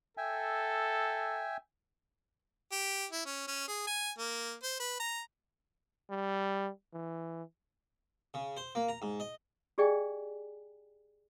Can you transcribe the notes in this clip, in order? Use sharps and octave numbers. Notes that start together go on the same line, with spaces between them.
A4 E5 G5 G#5
G4
E4
C#4
C#4
G#4
G#5
A#3
C5
B4
A#5
G3
E3
C#3
C5
A#3
A#5
G#2
D#5
G4 G#4 D5 D#5 G5 G#5